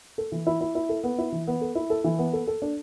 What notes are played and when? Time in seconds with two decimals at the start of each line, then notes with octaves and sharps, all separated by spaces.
0.18 A4
0.32 E3
0.47 E4
0.61 E4
0.75 E4
0.89 A4
1.04 B3
1.18 E4
1.32 E3
1.47 B3
1.61 A4
1.75 E4
1.90 A4
2.04 E3
2.19 B3
2.33 A4
2.47 A4
2.62 D4